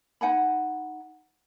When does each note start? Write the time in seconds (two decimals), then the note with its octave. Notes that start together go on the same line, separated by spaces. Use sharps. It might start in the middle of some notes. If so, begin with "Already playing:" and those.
0.21 D#4 F#5 G#5 B5